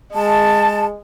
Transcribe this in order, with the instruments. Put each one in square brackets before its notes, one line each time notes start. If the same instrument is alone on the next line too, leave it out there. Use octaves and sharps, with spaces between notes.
[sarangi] G#3 [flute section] A5